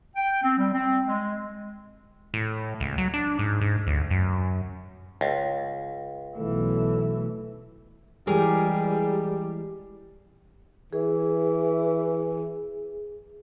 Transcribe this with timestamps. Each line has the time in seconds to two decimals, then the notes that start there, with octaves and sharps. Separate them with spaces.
0.16 G5
0.42 C4
0.57 G3
0.73 C4
1.06 G#3
2.34 A2
2.80 C#2
2.98 F#3
3.14 D4
3.39 G#2
3.61 G#2
3.87 D2
4.10 F#2
5.21 C#2
6.37 B1 E3 A3
8.27 E3 G3 G#3 G4 G#4 A#4
10.93 E3 G#4